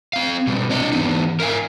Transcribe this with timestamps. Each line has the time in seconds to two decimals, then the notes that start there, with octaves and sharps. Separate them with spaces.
0.13 C4 F5
0.47 B2 G3
0.70 C4 D4 C#5 D#5
0.92 E3 B3 D#4
1.40 A#4 E5 F5 G#5